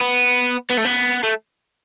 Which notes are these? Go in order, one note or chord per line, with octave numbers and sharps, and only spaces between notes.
B3
B3
A3
B3
A3